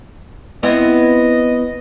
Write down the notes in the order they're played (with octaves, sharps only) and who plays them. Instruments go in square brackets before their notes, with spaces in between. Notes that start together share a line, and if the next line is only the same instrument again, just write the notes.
[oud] B3 C4 E4 [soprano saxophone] D#5